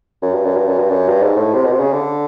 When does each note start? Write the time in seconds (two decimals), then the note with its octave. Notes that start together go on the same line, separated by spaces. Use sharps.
0.22 F#2
0.34 G2
0.44 F#2
0.56 G2
0.67 F#2
0.78 G2
0.90 F#2
1.08 G2
1.22 G#2
1.37 A2
1.54 C3
1.65 B2
1.72 C3
1.80 C#3
1.93 D3